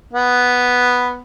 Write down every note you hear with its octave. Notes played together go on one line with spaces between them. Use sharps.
B3